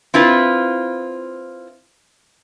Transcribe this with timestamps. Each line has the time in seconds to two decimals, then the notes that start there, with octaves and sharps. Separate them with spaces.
0.14 C4 E4 F4 B4